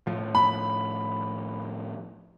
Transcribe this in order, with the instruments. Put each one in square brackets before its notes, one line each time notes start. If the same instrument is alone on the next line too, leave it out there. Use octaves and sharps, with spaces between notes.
[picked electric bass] A2 F3
[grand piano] B5